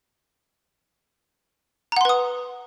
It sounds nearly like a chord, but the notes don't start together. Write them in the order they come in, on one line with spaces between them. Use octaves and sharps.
A#5 F#5 C6 B4 D#6